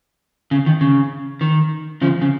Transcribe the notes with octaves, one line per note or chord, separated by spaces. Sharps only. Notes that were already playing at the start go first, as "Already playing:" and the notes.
C#3
D#3
C#3
D#3
C#3 F3
C#3